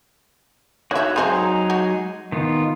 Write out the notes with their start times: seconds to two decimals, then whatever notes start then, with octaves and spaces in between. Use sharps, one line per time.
0.91 D#4 F#4 C#5 E5 F#6
1.16 F#3 G#3 C4 D#4 G#4 C5
1.70 F#4
2.32 D#3 B3 F4